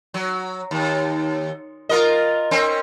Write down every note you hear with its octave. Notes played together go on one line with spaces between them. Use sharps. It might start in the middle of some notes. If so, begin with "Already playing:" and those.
F#3
D#2
F4 A#4 D#5
C4 C#4